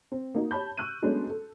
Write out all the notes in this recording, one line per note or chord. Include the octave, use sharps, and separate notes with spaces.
C4
A#3 D#4 F#4
G4 C#5 A5 B5 G6
C#6 E6 F#6 G6 D#7
F#3 G#3 A3 B3 C#4 D4
A4